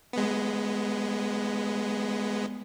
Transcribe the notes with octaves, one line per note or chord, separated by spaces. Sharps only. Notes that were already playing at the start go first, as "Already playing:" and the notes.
G#3 B3